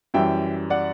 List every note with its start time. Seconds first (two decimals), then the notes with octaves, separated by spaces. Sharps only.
0.14 F#2 E3 G3 E5 G5
0.70 D5 F#5